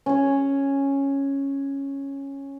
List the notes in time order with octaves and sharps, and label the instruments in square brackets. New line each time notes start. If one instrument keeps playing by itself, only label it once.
[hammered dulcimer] C#4 C#5